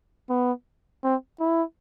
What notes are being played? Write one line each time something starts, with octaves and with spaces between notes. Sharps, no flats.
B3
C4
E4